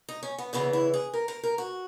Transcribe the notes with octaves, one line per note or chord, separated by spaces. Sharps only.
D#4
C#4
B3
E2 C#3 E3 B3
E4
G#4
A#4
A#4
A#4
F#4